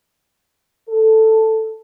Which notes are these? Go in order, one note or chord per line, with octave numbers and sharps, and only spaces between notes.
A4